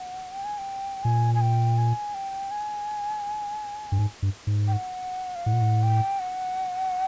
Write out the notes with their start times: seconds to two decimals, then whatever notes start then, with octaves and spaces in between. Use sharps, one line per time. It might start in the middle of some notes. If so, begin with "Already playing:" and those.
Already playing: F#5
0.31 G5
0.45 G#5
0.58 G5
1.04 A#2 G#5
1.35 G#5
1.41 G5
1.78 G#5
2.14 G5
2.51 G#5
3.92 G2
3.99 G#2
4.22 G2
4.47 G#2
4.67 G5
4.73 F#5
5.35 F5
5.46 A2 F#5
5.53 A#2
5.61 A2
5.83 G5
6.19 F#5